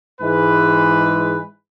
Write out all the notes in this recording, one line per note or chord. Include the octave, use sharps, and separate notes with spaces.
G#2 E3 G#3 B4